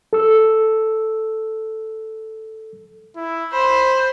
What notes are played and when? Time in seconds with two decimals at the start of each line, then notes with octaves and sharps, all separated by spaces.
0.13 A4 E6
3.16 E4
3.52 C5 B5